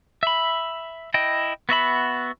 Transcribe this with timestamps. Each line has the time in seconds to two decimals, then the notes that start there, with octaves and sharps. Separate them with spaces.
0.23 E5 B5
1.14 E4 D#5 G5
1.69 B3 F#4 E5 B5